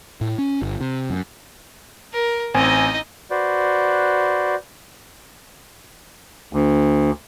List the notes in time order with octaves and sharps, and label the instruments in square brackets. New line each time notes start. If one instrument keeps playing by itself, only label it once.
[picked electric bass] A2
C#4
G1
C3
F#2
[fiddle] A#4
[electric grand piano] A1 C4 G#5 [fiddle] D#4 D#5
[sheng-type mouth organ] F#4 B4 C5 D5
[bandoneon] D2